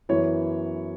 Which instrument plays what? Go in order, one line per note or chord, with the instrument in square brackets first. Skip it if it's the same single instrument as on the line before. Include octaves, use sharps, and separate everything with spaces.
[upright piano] F#2 E3 B3 E4 C#5